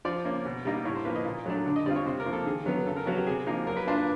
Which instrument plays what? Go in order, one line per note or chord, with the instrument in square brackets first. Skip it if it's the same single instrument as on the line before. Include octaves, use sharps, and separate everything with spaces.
[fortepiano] F3 D5
A#3 C#4
B2
G3 A#3 D#4
A2 C#5
C5
F3 A#3 B4
D#5
A#2
F#3 A3 D4
D3
D#5
G3 C4 F4 D5
C#5
C3 C5
A#4
F3 A#3
A4
D#3 G#4
F#3 B3
C#3 A4
A#4
F#3 B3 F#4
G4
C3 G#4
F3 A#3 D#4
F#3 A#4
B4
A#3 D4 F4 C5
B4